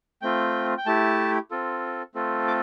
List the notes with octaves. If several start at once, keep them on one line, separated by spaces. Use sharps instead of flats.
A3 C4 F4 G5
G5
A3 E4 G4 A5
C4 F4 A4
A3 C4 F4 A4
D6